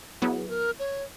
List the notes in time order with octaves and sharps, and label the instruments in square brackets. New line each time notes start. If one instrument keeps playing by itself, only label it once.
[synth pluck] F#3 B3 E4 [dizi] G#4
[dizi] A#4
C#5